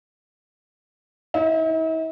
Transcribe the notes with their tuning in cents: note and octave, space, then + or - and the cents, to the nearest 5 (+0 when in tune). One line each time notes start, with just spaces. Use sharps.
E4 -45